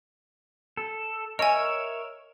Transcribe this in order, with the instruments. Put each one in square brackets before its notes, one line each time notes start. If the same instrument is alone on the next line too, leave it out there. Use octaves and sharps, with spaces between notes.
[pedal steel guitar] A4
[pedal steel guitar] A#4 C#5 E5 [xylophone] D#5 G#5